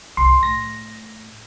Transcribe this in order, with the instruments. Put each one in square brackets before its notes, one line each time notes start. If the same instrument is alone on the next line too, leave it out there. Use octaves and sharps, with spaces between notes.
[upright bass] G1 C2 [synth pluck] C6
[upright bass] A2 [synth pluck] A#6